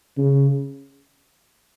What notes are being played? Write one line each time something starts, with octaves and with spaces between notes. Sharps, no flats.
C#3